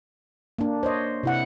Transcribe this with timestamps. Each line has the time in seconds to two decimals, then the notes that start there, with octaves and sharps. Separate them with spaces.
0.59 A#3 D4
0.83 C5 C#5 D#5
1.23 C3 E4 F#5